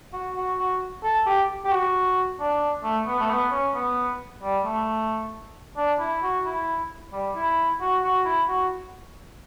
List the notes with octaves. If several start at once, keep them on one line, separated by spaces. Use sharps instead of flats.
F#4
F#4
F#4
A4
G4
G4
F#4
D4
A3
B3
A3
B3
C#4
B3
G3
A3
D4
E4
F#4
E4
G3
E4
F#4
F#4
E4
F#4